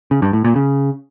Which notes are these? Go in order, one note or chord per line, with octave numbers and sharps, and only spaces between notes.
C#3
G2
A2
A#2
C#3